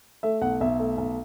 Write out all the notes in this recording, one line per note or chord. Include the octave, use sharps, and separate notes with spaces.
A3 E5
B1 F#5
B1 E5
A3
B1